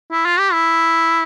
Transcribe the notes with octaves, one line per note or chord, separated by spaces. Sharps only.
E4
F4
G4
E4